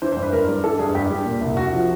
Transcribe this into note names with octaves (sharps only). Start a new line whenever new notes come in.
E3 C5
C5
G2
B4
G2 A#4
G3
E3 A4
G2 G#4
G2 G4
G3
A#2
C2
C2 F#4
F3